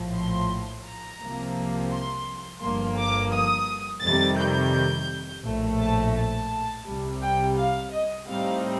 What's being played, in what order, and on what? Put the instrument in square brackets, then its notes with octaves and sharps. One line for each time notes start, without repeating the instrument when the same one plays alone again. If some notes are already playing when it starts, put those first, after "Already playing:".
Already playing: [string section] A#1 A2 F3
C6
A#5
C2 C3 F3 A#3
C6
G1 G2 F3 A#3 C6
D6
D#6
F2 C3 D#3 G3 A6
G6
A#1 A2 A3
A5
A5
C2 C3 G3
G5
F5
D#5
A2 G3 C4 D#4 F5